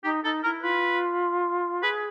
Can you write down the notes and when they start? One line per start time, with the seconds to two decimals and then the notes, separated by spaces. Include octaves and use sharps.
0.03 D#4 G4
0.24 D#4 A4
0.43 E4 A#4
0.63 F4 B4
1.82 G#4 B4